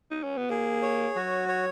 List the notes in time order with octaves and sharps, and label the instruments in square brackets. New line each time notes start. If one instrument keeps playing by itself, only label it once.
[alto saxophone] D#4
C#4
B3
[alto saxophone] A#3 [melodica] G#4
[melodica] C#5
[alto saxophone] F#3 [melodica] F#4
[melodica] C#5